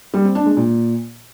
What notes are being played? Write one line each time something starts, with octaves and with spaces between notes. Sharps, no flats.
G3
C4
D4
G#3
A#2